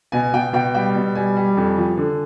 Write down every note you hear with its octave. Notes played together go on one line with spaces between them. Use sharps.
B2 G#5
B2 G5
B2 G5
G3 G5
B2
G3 G#5
G3
F2
F3
D3